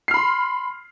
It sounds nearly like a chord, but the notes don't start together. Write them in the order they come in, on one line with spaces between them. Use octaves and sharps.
C7 F6 B5 C6